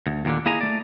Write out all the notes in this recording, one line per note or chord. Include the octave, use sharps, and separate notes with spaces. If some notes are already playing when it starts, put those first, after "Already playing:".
D2
D#2 A#2 D3
A#3 E4 G#4 D#5 G#5 A#5
A3 D5